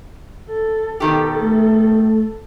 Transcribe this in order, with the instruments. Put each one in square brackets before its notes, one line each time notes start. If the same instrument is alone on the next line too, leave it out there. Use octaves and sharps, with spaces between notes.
[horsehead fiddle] A4
[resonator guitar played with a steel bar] B2 D#3 G4 [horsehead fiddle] A4
[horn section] A3